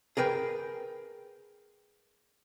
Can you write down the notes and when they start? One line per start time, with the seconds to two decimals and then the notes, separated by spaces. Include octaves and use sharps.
0.17 G#4 A#4 B4 G5